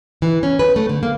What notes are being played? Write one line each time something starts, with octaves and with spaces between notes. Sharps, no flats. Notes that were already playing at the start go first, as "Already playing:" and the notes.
E3
C#4
B4
A3
D3
A#3